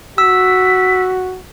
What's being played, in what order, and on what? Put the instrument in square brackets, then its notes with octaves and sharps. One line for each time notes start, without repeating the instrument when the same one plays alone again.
[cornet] F#4 [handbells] E6 [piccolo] B6